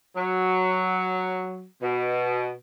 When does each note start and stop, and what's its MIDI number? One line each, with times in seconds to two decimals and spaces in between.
0.16 1.65 54
1.83 2.52 47